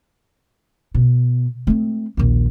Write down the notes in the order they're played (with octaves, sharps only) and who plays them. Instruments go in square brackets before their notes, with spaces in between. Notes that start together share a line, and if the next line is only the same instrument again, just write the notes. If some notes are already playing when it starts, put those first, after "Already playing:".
[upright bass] B2
A3 C4
A#1 D#2